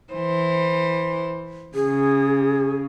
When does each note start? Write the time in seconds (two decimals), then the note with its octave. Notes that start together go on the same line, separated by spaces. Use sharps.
0.12 E3 C5
1.75 C#3 G#4